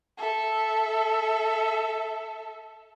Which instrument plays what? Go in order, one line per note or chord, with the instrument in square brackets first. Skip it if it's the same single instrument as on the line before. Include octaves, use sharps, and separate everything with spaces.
[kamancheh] A4 E5